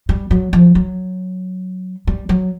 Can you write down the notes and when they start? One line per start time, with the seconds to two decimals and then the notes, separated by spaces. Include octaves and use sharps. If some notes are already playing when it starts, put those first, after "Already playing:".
0.09 G3
0.31 F#3
0.53 F3
0.75 F#3
2.07 G3
2.29 F#3